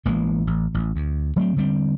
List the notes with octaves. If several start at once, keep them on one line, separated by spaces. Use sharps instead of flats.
A1 E3 G#3 A#3
A1
A1
D2
F#3 A3 B3 C4
D3 G3 C4